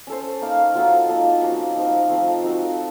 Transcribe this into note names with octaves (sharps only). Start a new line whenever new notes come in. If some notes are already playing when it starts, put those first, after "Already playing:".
C#4 A4 C5
A#3 D#4 A#4 F5
F#3 C4 F4 A4
A#3 D#4 A4 D#5
F3 A#3 C#4 F#4
F3 C4 D#4 A#4
F3 A3 C4
C4 D#4 F#4 A4